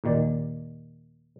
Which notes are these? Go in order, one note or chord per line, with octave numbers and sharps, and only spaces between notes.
D#2 A#2 D#3 D5